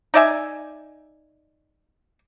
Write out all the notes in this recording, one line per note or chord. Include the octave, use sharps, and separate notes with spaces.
D#4 D5 E5 G#5